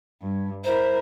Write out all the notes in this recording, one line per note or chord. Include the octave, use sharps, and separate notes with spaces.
G2
E4 A#4 C5